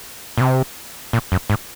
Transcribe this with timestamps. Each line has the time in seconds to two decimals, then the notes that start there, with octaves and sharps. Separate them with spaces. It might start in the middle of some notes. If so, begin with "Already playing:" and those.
0.38 A#2
0.41 C3
1.13 A#2
1.32 F#2
1.50 G#2